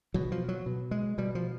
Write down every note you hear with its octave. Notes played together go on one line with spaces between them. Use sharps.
B2 F#3
F3
F#3
B2
G#3
B2 G3
F3